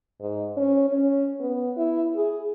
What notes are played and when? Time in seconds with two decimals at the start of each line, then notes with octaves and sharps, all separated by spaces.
0.20 G#2
0.57 C#4
0.89 C#4
1.40 B3
1.77 E4
2.15 G#4